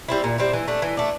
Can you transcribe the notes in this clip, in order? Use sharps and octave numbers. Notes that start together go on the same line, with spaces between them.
G3 C4 E4
A#2
G3 C4 E4
E3
A3 D4
E3
A3 D4